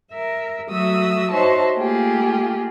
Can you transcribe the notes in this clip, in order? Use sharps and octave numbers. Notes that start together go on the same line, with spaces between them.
A#4 E5
F#3 A3 F#4 E5 D#6 E6
D#4 F#4 C5 C#5 E5 A5
A3 A#3 F4 G4 G#4